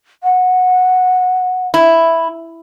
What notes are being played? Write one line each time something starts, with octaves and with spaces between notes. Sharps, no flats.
F#5
E4